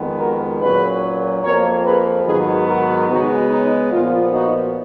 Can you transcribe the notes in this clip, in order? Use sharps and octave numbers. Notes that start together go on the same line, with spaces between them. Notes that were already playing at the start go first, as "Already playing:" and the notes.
Already playing: F2 D#3 G#3 B3
F#4 A#4
A#2 F#3 C#4 G#4 B4
F2 F3 A#3 A#4 C#5
G#4 B4
G#2 D#3 F#3 B3 G#4 B4
F#4 A#4
C#3 G#3 B3 D#4 F#4
D#4
A#2 F3 B3 F4
D#4 F#4